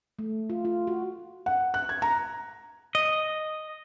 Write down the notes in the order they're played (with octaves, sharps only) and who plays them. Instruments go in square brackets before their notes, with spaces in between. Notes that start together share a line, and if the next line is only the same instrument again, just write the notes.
[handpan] A3
F4
F4
F#4
[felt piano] F#5
F#6
G#6
A#5
[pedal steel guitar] D#5